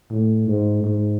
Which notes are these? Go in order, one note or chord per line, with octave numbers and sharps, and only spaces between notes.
A2
G#2
G#2